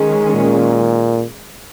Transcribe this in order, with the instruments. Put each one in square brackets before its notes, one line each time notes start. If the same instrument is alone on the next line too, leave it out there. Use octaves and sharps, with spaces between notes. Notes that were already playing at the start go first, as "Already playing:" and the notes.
Already playing: [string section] D#3 G#3 C#4
[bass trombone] A#2